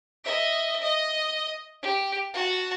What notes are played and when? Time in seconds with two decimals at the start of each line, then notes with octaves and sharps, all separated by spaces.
0.25 D#5 E5
0.82 D#5
1.82 G4
2.34 F#4 A5